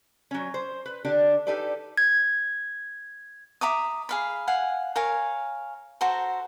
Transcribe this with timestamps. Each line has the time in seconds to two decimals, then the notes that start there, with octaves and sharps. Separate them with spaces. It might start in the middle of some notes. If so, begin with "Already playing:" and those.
0.31 F#3 C#4
0.54 C5
0.86 B4
1.05 D3 D4 G4 D5
1.47 D#4 G4 A4 B4 D5
1.97 G#6
3.61 E5 A#5 D6 D#6
4.09 G#4 F5 B5
4.48 F5 F#5 G#5
4.96 A#4 C#5 F5 G#5
6.01 F#4 A4 C5 A#5